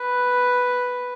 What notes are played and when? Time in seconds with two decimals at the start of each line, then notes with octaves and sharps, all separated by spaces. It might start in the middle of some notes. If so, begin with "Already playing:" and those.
Already playing: B4